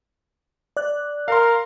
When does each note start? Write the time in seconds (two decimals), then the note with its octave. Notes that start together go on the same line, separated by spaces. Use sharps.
0.77 D5 F#6
1.28 A#4 F5 C6